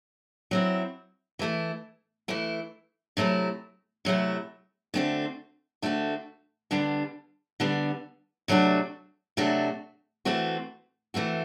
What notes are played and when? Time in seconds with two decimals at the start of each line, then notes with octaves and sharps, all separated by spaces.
0.51 F#3 C4 E4
1.39 E3 A3 E4
2.28 E3 A3 E4
3.17 C3 F#3 A3 E4
4.05 C3 F#3 A3 E4
4.94 D3 A3 C4 F#4
5.82 D3 A3 C4 F#4
6.71 D3 G3 B3 D4
7.60 D3 G3 B3 D4
8.48 C3 F#3 A3 D4 F#4
9.37 C3 F#3 A3 D4 F#4
10.25 E3 A3 C4 F#4
11.14 E3 A3 C4 F#4